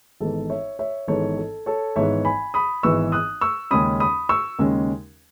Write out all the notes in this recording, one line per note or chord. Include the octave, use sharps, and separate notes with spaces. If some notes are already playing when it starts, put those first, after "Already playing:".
G#1 G#2 E3 B3 A4
C#5 E5
C#5 E5
G#1 G#2 E3 B3 A4 C#5
A4
A4 C#5
G#1 G#2 E3 B3 C#5 E5
G#5 B5
B5 D#6
G#1 G#2 E3 B3 C#6 E6
D#6 F#6
C#6 E6
D#2 C#3 G#3 C#4 B5 D#6
B5 D#6
C#6 E6
D#2 C#3 G#3 C#4